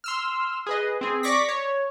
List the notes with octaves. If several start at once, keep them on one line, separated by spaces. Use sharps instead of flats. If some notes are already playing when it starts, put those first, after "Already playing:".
C6 E6 F6
G#4 B4 D#5
C4 G#4
D5 C#6 D6 A#6 B6
C#5